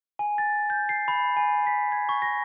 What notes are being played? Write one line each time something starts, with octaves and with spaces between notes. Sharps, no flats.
G#5
A6
G6
C7
B5
G#5
B6
G#6
C#6
A#6